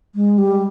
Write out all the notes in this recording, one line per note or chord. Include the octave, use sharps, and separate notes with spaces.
G#3
G3